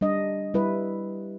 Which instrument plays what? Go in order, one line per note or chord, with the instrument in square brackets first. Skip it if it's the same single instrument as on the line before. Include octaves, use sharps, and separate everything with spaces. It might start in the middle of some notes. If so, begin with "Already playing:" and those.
[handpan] G3 D4 D#5
G3 E4 B4